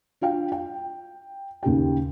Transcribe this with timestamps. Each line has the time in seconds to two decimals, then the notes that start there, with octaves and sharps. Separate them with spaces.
0.21 D4 F4 F5 G5
0.52 G5
1.63 D#2 C#3 G4 G5